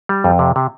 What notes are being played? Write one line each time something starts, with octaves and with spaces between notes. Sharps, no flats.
G3
F2
C3
C3